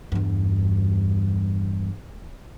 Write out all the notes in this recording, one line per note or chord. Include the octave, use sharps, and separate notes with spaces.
E2 G2